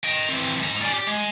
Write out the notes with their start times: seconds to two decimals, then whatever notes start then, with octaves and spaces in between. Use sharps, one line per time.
0.04 D#5 G5
0.29 E3 C4
0.63 G#2 A#5
0.81 C#4 D5
0.93 G4
1.07 G#3